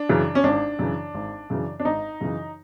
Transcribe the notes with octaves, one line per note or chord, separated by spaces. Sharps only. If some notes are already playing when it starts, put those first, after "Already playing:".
Already playing: D4
F#2 C#3 E3
C#4
G#1 D4
F#2 C#3 E3
G#1
F#2 C#3 E3
D4
G#1 D#4
F#2 C#3 E3